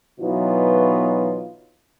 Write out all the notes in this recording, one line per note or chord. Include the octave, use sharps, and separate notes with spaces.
B2 E3 F#3 B3 D#4 F4